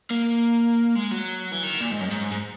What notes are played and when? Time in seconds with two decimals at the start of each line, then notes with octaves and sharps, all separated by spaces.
0.11 A#3
0.96 G#3
1.12 F#3
1.52 E3
1.63 D#3
1.81 A#2
1.91 G#2
2.01 F#2
2.11 G#2
2.31 G#2